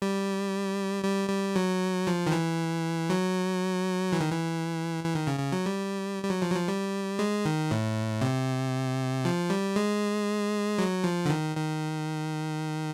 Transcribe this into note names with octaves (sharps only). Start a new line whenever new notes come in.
G3
G3
G3
F#3
F3
D#3
E3
F#3
E3
D#3
E3
E3
D#3
C#3
C#3
F#3
G3
G3
F#3
F3
F#3
F3
G3
G#3
D#3
A2
C3
F3
G3
G#3
F#3
F3
D3
D#3
D#3